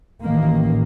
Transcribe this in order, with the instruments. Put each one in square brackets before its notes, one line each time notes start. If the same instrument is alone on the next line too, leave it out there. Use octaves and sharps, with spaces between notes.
[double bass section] A1 D#3 A#3